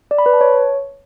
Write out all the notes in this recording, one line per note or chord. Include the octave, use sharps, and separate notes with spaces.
D5
B5
B4
A5
C#5